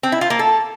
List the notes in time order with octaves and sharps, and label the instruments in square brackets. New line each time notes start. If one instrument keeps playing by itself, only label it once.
[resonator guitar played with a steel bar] C4
E4
F4
A#3
A4